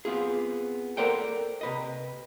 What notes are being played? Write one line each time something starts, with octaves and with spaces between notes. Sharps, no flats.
B3 C4 F4 G#4
A4 A#4 C5 D5 F#5 G5
C3 B4 D#5